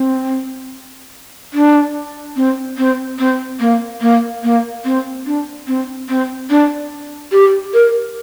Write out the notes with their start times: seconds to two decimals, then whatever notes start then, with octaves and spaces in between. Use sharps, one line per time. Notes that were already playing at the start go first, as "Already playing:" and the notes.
Already playing: C4
1.54 D4
2.36 C4
2.78 C4
3.19 C4
3.60 A#3
4.01 A#3
4.44 A#3
4.85 C4
5.26 D4
5.68 C4
6.09 C4
6.50 D4
7.32 G4
7.74 A#4